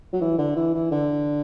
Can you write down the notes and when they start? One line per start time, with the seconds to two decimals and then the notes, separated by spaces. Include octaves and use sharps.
0.13 F#3
0.21 E3
0.38 D3
0.56 E3
0.74 E3
0.91 D3